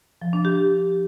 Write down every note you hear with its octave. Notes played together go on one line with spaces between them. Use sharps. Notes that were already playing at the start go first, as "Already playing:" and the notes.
F3
D4
G4